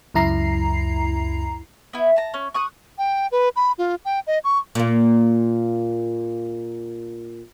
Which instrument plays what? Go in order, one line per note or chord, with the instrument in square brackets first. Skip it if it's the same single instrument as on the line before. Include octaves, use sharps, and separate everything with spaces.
[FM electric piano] C#2 F#2 E4 A#5 C7
[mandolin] B3 E4
A5 A#5
C#4
C#6 D#6 F#6
[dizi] G5
B4
B5
F4
G5
D#5
C#6
[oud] A#2 A#3